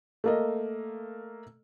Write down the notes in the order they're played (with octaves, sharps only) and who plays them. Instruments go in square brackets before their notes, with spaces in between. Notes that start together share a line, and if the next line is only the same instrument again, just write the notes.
[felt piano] A3 A#3 D#5